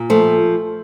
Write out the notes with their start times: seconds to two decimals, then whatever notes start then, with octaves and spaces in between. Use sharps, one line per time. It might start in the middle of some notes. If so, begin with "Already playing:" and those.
Already playing: A#2
0.10 F3 A3